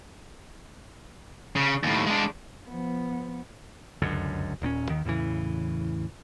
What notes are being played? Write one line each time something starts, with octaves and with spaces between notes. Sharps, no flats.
C#3
D#2 A2
G#3 D4
F3 B3
F1 C#2 F#2 D3
D#1 A#2 C4 C#4
D#2 D#3
E2 A2 C#3 E3